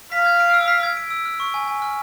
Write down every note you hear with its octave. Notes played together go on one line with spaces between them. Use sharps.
F5 B6
G#6
D7
E6
B6
G#6
D7
E6
F6
C#6
G#5
G#5
F6